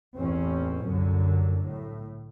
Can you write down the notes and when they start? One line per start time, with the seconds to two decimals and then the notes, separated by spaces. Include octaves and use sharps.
0.17 A1 E2 A2 C4 C#4
0.84 C2 F#2 D3 F#3
1.63 A2